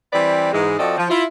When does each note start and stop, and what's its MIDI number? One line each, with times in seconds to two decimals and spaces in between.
0.13 0.49 52
0.13 0.49 55
0.13 0.49 60
0.13 0.49 71
0.13 0.49 74
0.53 0.78 44
0.53 0.78 52
0.53 0.78 56
0.78 0.96 53
0.78 0.96 60
0.78 0.96 66
0.78 0.96 69
0.78 0.96 74
0.78 0.96 75
0.98 1.08 53
1.10 1.24 64
1.10 1.24 65